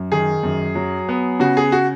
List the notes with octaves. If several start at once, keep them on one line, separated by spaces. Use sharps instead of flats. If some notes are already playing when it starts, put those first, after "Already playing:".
Already playing: F#2
D#3 G#4
F#2
F#3
B3
C#3 F#4
G#4
F#4